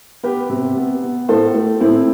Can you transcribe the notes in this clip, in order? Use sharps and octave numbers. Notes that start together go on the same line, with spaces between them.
B3 G4 B4
C3
B3
B3
A2 A4 C5
A3
A2 C4 E4